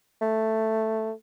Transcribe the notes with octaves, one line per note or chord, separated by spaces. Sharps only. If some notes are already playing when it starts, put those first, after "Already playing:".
A3